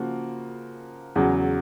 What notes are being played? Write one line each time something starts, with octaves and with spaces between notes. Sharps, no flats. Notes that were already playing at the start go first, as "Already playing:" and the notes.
Already playing: C#3 F3 A#3 F#4
E2 C#3 F#3